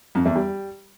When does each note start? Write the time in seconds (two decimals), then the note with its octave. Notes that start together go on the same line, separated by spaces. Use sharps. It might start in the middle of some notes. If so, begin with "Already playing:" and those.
0.15 F2
0.25 E2
0.36 G3